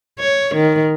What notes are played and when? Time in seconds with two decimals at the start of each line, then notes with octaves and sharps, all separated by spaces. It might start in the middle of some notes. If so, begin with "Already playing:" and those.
0.19 C#5
0.55 D#3